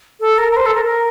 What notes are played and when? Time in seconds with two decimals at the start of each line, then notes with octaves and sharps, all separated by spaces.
0.20 A4
0.38 A#4
0.52 A#4
0.57 C5
0.66 A4
0.75 A#4
0.85 A#4